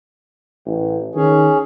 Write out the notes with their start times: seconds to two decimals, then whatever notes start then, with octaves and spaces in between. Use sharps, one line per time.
0.66 A1
1.15 D#3 C#4 G#4